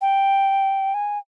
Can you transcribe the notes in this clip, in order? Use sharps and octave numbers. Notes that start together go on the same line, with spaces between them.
G5
G#5